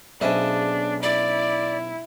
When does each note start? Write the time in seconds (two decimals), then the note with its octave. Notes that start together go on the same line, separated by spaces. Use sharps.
0.21 B1 C#3 D4 G#4 C5 D#5 E5
1.03 E4 D5